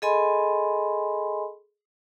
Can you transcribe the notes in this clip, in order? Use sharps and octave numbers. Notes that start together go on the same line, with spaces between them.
G#4 A4 D#5 G#5 B5 C6